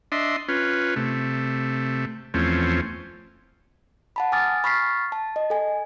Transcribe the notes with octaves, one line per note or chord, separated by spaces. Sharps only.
D4 D#5 E5 C6
C#4 F4 B4
C3 A3
E2 F3 A3 C4 C#4
F#5 A5 B5
G#5 D6 D#6 F6 A6
B5 C#6 F6 A6 B6 C7
A5
D#5
A4 G#5